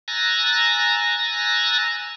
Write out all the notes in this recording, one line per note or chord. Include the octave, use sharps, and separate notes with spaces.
G#5 A#5 E6 F#6 A6 A#6